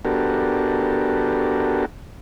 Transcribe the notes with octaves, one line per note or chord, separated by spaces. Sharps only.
B3 D4 F#4 G4 A4 A#4